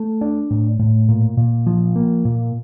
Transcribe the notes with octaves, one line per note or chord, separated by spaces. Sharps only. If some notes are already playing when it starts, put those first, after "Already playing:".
Already playing: A3
D4
A2
A2
A#2
A#2
F3
A#3
A#2